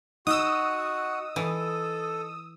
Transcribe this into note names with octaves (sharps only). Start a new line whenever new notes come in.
D#4 F#4 D#5 F#5 D#6 E6
E3 A4